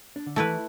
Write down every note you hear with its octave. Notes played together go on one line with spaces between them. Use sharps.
D4
D3
E3 A3 E4 B4